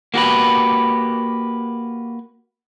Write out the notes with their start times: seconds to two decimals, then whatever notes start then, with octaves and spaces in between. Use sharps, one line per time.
0.14 A#3 F#4 G4 B4